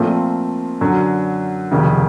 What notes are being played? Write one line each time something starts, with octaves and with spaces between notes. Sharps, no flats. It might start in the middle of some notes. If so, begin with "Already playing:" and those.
Already playing: A#2 F3 A3 C4 F4
F#2 D3 F#3
F1 D#2 C#3